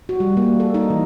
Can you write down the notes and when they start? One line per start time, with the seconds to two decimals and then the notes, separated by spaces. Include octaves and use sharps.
0.09 F#4
0.20 G3
0.37 A#3
0.60 A4
0.74 D#4
0.90 E3